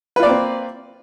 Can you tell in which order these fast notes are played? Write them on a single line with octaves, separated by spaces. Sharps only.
B4 F4 D5 A#3 C4